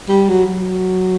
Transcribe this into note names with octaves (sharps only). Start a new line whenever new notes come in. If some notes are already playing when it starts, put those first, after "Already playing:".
G3
F#3
F#3